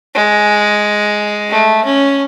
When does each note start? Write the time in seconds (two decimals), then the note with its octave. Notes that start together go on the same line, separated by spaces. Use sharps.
0.15 G#3
1.50 A3
1.85 C#4